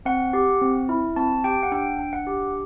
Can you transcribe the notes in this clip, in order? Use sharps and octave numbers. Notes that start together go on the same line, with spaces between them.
C4 F#5
G4
C4
E4
C4 A5
G4 G5
F#5
D4 G5
D4
F#5
G4